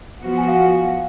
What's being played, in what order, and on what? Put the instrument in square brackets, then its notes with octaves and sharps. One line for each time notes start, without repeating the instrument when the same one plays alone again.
[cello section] F3 B3 F#4
[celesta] G#5
F5
F#5
F5
F5